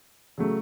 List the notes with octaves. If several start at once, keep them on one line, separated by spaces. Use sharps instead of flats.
C#3 F#3 A3